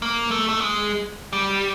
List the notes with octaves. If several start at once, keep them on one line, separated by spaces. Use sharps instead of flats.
A#3
A3
A3
G#3
G3